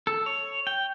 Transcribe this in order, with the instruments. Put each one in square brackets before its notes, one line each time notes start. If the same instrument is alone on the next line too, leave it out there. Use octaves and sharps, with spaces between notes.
[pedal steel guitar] A4
C#5
G5